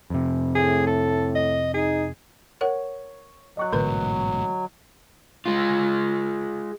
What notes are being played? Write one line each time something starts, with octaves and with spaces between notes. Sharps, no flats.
F2 C3
A2 G#4
A4
D#5
D#4 G#4
A#4 C#5 F#5
F#3 D#5 C#6 F#6
A1 G#2 B2 D3 B4
G#3 F4